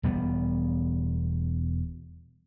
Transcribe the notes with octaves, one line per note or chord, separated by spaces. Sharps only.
E1 G3 B3